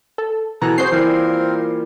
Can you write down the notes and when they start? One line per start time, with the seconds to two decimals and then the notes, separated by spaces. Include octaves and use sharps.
0.18 A4
0.62 B2 E3 A4 G#5 A#5 F#6
0.78 C4 F#4 G#4 C5 G6 C7
0.92 A#2 E3 G3 C4 A#4